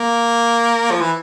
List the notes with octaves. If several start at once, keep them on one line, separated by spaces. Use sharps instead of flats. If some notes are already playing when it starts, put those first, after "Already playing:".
Already playing: A#3
F3
E3